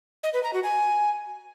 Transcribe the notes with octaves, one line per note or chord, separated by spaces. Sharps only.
D#5
B4
A#5
F#4
G#5